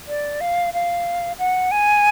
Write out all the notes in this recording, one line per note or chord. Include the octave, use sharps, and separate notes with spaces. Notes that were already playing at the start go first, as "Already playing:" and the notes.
D5
F5
F5
F#5
G#5